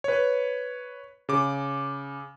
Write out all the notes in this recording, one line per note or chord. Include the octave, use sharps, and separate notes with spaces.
B4 C#5
C#3 D6